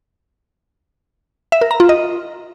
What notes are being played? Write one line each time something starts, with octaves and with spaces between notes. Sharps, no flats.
E5
A#4
A#5
F4
D#5